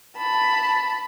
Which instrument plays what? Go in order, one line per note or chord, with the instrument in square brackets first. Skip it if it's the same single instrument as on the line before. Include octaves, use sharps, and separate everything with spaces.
[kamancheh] A5 B5